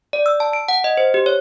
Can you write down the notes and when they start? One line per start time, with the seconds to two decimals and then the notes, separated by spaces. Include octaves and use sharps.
0.13 D5
0.26 E6
0.40 A5
0.53 D7
0.68 F#5
0.84 D#5
0.97 C5
1.14 G4
1.26 C#5